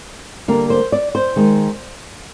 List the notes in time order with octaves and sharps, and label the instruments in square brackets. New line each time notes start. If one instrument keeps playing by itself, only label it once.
[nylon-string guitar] D3 G3 A#3 A#4
C5
D5
C5
D#3 G#3